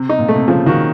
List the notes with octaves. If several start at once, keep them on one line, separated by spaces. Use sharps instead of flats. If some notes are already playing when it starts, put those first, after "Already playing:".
Already playing: C3
D#4
A#2
A3
C3
C#3 F3
D#3 F#4